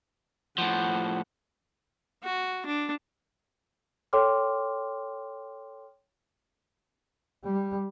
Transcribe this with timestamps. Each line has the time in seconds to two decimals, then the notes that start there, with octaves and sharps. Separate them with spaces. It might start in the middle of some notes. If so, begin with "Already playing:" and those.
0.58 A2 F3 F#5
2.24 F#4
2.66 D4
4.13 A4 C#5 G5 C6 D6 F6
7.45 G3